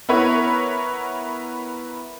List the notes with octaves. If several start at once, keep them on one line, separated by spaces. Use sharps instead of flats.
B3 E4 A#4 B4 C#5 F#5